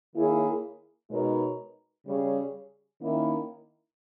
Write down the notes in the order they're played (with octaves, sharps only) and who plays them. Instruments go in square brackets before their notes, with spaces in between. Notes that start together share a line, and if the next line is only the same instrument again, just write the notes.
[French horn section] D#3 A#3 E4 G#4 C#5
B2 G#3 D#4 A#4 C#5
C#3 G3 C#4 G#4 C#5
D#3 A#3 C#4 E4